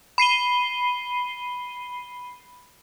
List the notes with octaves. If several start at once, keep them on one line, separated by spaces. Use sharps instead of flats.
B5 C7 D#7 G7